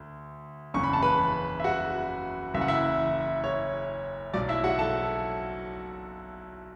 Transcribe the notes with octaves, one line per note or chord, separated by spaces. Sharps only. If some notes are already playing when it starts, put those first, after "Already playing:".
Already playing: D2
F#1 E2 C#3 C#6
B5
A5
B4 B5
E5
F#4 F#5
F#1 F#2 E3 E5
F#5
E4 E5
C#5
B1 B2 F#3 D5
E4 E5
F#4 F#5
A4 A5